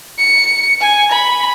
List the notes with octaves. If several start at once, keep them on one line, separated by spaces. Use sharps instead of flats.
C#7
G#5
B5